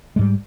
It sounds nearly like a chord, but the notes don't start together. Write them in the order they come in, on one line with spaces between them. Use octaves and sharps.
G#3 G#2 G3